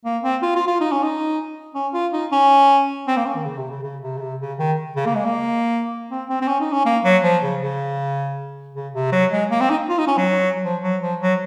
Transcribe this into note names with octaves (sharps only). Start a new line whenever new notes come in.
A#3
C4
F4
F4
F4
D#4
C#4
D#4
C#4
F4
D#4
C#4
C4
A#3
C#4
D#3
C#3
C3
C#3
C#3
C3
C#3
C3
C#3
D#3
C#3
A#3
G#3
A#3
C4
C4
C4
C#4
D#4
C#4
A#3
F#3
F3
C#3
C#3
C#3
C3
F#3
G#3
A#3
C4
D#4
F4
D#4
C#4
F#3
F3
F#3
F3
F#3